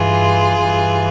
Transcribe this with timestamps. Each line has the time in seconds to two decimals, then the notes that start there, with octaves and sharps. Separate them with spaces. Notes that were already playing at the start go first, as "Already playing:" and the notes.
Already playing: G2 E3 F4 G#4
0.55 G2 E3